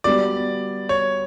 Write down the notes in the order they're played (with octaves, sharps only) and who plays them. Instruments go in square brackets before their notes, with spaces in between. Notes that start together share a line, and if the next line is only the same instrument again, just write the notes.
[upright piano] G3 B3 F#4 [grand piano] D5
[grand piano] C#5